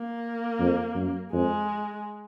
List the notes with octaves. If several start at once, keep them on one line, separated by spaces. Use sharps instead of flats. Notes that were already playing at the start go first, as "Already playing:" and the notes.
Already playing: A#3
F2
F#2
F2 G#3